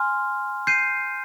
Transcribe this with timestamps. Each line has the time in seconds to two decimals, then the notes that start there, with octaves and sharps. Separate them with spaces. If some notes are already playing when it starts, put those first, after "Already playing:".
Already playing: G#5 C6 F6
0.67 G6 C7 D#7